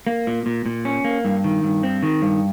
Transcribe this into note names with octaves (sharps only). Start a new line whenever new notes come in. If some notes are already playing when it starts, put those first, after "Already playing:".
A#3
A#2
A#2
A#2
C#4
A#3
G2
D#3
G2
C4
D#3
G2